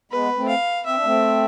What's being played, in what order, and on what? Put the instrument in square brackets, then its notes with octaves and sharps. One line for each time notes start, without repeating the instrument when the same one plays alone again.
[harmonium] G#3 B3 [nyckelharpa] B4
[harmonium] A3 C4
[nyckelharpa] F5
[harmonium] C4 [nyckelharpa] E5
[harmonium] D4
A3 C4